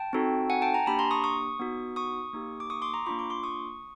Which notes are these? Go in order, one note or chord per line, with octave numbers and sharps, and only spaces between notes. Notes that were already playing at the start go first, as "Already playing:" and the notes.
Already playing: G5 A5
C4 D#4 F#4 A4
F#5 G#5
G5 A5
G#5 A#5
A#3 D4 G4 A5 B5
A#5 C6
C#6 D#6
C#6 D#6
B3 D#4 F#4
C#6 D#6
A#3 D#4 G4
D6
C#6 D#6
C6 D6
A#5 C6
A#3 D4 F4 B5 C#6
C6 D6
C6 D6
C#6 D#6